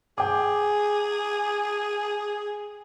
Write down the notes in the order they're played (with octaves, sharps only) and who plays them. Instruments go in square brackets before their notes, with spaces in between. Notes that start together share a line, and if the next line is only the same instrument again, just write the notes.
[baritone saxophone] G#4 [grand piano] G5 D6